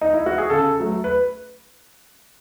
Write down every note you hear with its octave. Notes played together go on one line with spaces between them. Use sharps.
D#4
E4
F#4
G#4
C#3 A4
F#3 A3
B4